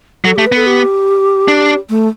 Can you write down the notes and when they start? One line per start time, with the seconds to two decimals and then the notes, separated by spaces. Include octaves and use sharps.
0.25 F#3 A4
0.36 A3 G4
0.46 B4
0.52 B3 A4
0.66 G4
1.48 D4
1.90 A3